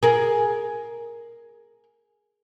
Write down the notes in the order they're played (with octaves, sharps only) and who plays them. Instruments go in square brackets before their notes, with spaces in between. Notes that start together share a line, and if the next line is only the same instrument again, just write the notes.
[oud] G#4 A#4